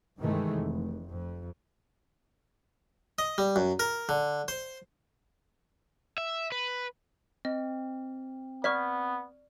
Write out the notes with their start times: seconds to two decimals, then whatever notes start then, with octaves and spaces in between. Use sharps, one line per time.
0.19 G2 C3 D#3 E3 G#3 A3
0.57 F1
1.10 F2
3.19 D#5
3.38 G3
3.56 F#2
3.80 A#4
4.09 D3
4.48 C5
6.18 E5
6.52 B4
7.45 C4 D#5
8.64 B3 D5 C#6 F6 B6